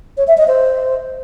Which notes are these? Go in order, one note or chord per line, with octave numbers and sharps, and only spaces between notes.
C#5
E5
D#5
C5